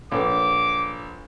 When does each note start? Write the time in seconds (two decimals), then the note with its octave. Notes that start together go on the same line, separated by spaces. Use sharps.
0.11 A#1 A4 B4 C#5 D6